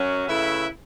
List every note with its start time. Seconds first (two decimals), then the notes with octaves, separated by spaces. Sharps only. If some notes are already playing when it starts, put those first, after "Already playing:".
Already playing: F#2 F#3 C#4 F#4
0.28 C#3 A3 E4 B4 E5